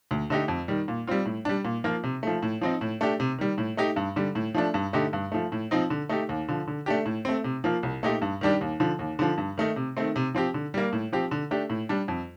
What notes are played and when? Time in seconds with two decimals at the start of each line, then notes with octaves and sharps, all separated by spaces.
0.11 D2
0.30 D3 A3 D#4 G4
0.48 F2
0.68 D#3 G3
0.88 A#2
1.07 G3 C4 F4
1.26 A2
1.45 G3 D4
1.65 A#2
1.84 F3 A#3 F4
2.04 C3
2.23 F3 A3
2.42 A2
2.61 F3 C4 D#4
2.81 A2
3.01 A3 D4 G4
3.20 C3
3.39 D#3 G3
3.58 A2
3.77 A3 D#4 G4
3.96 G2
4.16 D3 G3
4.35 A2
4.54 F3 A3 D4
4.74 G2
4.93 D3 A3 D#4 G4
5.13 G2
5.32 F3 A3
5.52 A2
5.71 F3 C4 D#4
5.90 D3
6.09 A3 D#4 G4
6.29 D#2
6.49 D3 F3
6.68 D3
6.86 A3 D4 G4
7.06 A2
7.25 A3 C4
7.44 C3
7.64 F3 A#3 F4
7.83 C2
8.03 A#2 A3 D#4 G4
8.22 G2
8.41 D#3 G3 D4 G4
8.61 D#2
8.80 D3 F3
8.99 D#2
9.19 D3 F3
9.38 G2
9.58 D#3 A3 D#4
9.76 C3
9.97 D#3 A3 C4
10.16 C3
10.35 F3 C4 G4
10.54 D3
10.74 G3 A#3
10.93 A2
11.12 F3 C4 G4
11.31 D3
11.51 A3 D4 G4
11.70 A2
11.89 G3 D4
12.08 F2